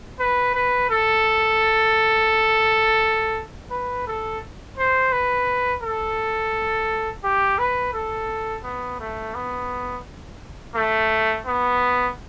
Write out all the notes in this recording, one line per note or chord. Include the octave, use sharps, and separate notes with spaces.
B4
B4
A4
B4
A4
C5
B4
A4
G4
B4
A4
B3
A3
B3
A3
B3